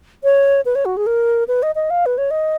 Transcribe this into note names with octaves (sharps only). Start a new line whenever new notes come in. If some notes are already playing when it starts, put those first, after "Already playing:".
C#5
B4
C#5
F#4
G#4
A#4
B4
D#5
D#5
F5
B4
C#5
D#5